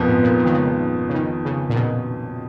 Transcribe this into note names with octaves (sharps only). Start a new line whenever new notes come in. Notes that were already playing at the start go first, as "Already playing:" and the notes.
Already playing: F2 A#2 F3 B3 F4
G#2
A#2
A#2
D#3
C#3
C#3
D#3
C#3
A#2
B2